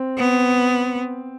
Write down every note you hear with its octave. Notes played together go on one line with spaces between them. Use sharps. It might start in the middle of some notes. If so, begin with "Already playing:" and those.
Already playing: C4
B3